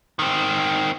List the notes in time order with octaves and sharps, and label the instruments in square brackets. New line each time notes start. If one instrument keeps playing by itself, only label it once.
[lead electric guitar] D#3 C4